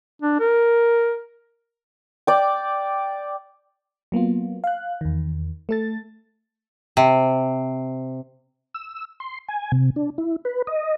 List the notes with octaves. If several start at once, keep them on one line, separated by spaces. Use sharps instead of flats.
D4
A#4
D5 G5
F#3 A#3 B3 F4
F5 F#6
E2 D#3
A3 A4 A6
C3
E6
C6
G#5
C3
D4
E4
B4
D#5